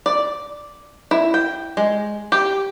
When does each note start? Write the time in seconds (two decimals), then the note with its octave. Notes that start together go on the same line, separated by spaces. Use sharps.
0.06 D5
1.11 E4
1.34 G5
1.77 G#3
2.32 G4